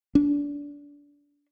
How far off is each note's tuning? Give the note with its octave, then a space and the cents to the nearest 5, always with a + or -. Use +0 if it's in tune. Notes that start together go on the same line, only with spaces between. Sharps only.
D4 -25